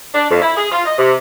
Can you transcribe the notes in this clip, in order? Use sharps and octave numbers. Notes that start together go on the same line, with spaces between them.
D4
F2
E4
G#4
F4
D#5
C3